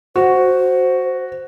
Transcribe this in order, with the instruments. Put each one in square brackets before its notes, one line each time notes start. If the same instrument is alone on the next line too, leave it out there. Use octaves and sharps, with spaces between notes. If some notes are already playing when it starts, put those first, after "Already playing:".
[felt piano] F#4 [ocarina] C5